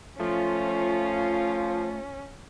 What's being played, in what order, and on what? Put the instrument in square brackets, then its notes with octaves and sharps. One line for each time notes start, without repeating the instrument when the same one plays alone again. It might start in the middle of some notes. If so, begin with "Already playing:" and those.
[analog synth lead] F3 [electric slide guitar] A3 [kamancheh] C#4 [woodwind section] F4